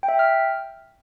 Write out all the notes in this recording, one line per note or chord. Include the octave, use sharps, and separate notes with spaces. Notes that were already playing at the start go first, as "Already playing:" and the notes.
G5
E5
G5
F6